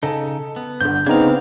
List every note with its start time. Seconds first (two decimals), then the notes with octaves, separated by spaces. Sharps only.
0.03 C#3 D#4 A4 A5
0.56 B3
0.81 G1 D3 G6
1.06 C#3 B3 C4 D4 D#4 F5 G#6